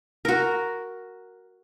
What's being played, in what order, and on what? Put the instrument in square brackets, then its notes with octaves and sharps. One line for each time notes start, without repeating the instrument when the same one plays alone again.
[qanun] F#4 A#4